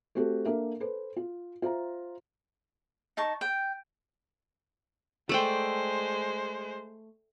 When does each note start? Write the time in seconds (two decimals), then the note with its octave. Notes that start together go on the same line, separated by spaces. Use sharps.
0.15 A3 C4 F#4 G4 A4
0.46 A#3 D4 A4 A#4 E5
0.80 A4 B4 C5
1.16 F4
1.62 F4 C5 E5 A#5
3.17 D#4 A5 C#6
3.41 G5
5.29 G#3 A3 C5 D5 G5